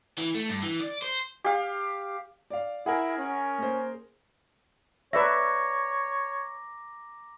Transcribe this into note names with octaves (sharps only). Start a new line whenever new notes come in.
E3
A3
G2
E3
D5
C5
G4 F5
D5 F5
E4 G#4 A#4 F#5 G#5
C#4
A#3 C5
B4 C#5 D5 E5 A#5 D6 A#6